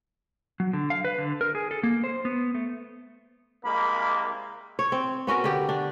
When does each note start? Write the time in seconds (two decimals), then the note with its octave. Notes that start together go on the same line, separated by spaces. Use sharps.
0.60 F#3
0.73 D3
0.90 F5
1.05 B4
1.18 D3
1.41 A#4
1.55 G#4
1.71 A4
1.83 A#3
2.04 C5
2.25 B3
2.55 A3
3.65 C2 G#3 A#3 B5
4.79 C#5
4.92 C4
5.27 B3 C#4 F#4 A#4
5.44 D3 G4
5.69 D4